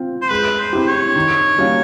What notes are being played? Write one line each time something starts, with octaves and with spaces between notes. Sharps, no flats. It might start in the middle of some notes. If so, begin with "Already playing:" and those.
Already playing: C4 F4
C5
G#3 B4
C5
C4 E4 G4
C#5
D#3
G3 A#3 C#4 F#4